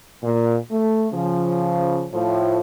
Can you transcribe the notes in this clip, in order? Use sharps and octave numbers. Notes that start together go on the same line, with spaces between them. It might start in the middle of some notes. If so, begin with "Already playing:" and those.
A#2
A3
C#3 F3
A2 F3